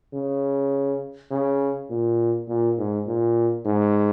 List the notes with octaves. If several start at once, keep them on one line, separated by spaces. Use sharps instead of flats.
C#3
C#3
A#2
A#2
G#2
A#2
G#2